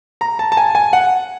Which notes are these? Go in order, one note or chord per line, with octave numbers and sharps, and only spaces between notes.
A#5
A5
A5
G#5
G#5
F#5